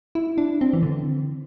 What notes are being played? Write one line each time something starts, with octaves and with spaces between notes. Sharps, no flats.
E4
D4
C4
E3
D3